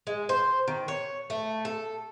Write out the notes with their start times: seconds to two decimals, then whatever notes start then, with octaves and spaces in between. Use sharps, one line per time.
0.07 G#3
0.29 C5
0.68 D#3
0.88 C#5
1.30 A3
1.65 A4